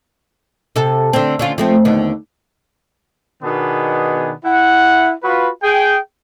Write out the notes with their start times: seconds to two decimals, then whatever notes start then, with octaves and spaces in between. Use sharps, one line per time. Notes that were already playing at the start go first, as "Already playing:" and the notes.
0.76 C3 A4
1.13 D3 C4
1.39 D3 C#4 F4
1.58 F3 A3 C4
1.85 D#2 D3 B3
3.43 B2 D#3 B3 D4 G#4
4.45 E4 F#5
5.23 F4 F#4 B4
5.62 G#4 G5